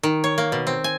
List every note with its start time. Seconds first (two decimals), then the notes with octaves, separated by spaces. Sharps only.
0.03 D#3
0.24 C#5
0.38 A#3
0.52 B2
0.67 C4
0.84 G#5